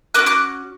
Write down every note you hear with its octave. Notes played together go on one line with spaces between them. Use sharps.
A#3 C#4 F#4 D6 F#6
D6 F#6